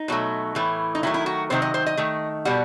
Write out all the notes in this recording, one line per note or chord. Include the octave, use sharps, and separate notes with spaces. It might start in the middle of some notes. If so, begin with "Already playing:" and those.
Already playing: D#4
B2 F#3 A3
A2 E3 A3
D#4
D#3 F#3 A3 E4
E4
F#4
C3 D#3 F#3 C5
D#5
C5
D#5
D#3 A3
B2 G3 F#5